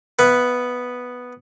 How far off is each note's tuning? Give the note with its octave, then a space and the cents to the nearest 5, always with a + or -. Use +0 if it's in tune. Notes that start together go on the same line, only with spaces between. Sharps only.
B3 +0 B4 +0 E5 +30